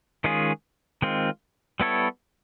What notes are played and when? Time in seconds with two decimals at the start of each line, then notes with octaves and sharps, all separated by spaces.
0.24 D#3 G#3 C#4 F4 G#4
1.02 D#3 G#3 C4 F4
1.80 G3 B3 E4 A4 C#5